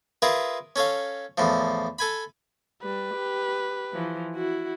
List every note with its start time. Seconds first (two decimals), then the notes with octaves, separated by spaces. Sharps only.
0.22 F4 G#4 A#4 B4 E5
0.76 C#4 A4 C#5 F5
1.38 E2 A2 F3
1.99 A4 G#5 B5
2.83 G3 B4
3.14 G4
3.93 E3 F3
4.35 E4 F#4